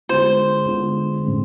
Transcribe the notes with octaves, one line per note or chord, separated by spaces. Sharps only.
D3 G#3 B3 F4 C5
D3 G#3 B3 F4
A2 G#3 C4